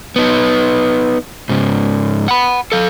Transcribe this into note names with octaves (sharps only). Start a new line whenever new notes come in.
B3 D#4
G#2 C#3
F#5 B5
A4 F5